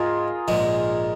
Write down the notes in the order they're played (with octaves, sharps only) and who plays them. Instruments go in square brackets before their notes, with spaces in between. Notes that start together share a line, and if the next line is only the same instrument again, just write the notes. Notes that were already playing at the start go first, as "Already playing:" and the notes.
Already playing: [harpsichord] G#2 G#3 [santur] F4 G#4 A#4
[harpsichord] A#1 G#2 G#3